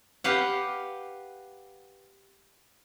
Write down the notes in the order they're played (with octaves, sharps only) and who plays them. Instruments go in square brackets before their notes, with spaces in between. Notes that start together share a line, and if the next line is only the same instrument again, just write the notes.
[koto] G4 B4 F5 F#5